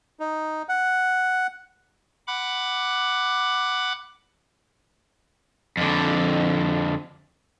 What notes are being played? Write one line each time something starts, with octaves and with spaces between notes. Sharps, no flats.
D#4
F#5
F#5 B5 D6 F#6
F2 D3